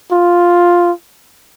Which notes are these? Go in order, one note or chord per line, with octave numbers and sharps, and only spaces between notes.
F4